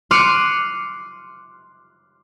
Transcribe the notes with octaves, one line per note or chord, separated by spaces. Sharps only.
C6 D6 F6 F#6 C#7 D#7